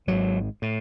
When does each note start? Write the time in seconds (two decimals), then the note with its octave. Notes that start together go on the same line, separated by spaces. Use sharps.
0.07 G#1 G#2 F#3
0.62 A2